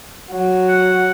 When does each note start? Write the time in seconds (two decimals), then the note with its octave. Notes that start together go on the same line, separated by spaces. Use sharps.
0.31 F#3
0.69 F#5